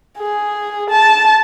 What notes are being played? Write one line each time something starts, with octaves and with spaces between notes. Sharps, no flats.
G#4
A5